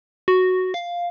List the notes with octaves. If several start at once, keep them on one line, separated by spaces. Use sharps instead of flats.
F#4
F5